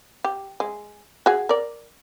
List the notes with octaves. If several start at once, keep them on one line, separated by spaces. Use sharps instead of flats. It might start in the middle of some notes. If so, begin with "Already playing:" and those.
G4
G#3
F#4 G#4
A#4 D5